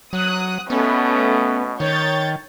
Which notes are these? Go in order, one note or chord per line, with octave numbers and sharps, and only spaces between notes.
F#3 D#6 F#6
B2 A3 B3 C#4
D#3 C#5 G6 A6